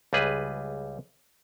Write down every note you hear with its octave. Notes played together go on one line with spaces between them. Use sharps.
C#2 G3 G#4 B4